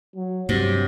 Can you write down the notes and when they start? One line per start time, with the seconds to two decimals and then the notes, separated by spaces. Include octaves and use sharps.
0.16 F#3
0.49 G2 C3 F#3